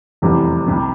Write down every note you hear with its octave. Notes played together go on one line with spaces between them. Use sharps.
F1 E2 C3 E3 G3
C2 C3 G3